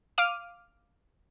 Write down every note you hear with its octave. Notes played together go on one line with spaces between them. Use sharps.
F5 D6 F6 D#7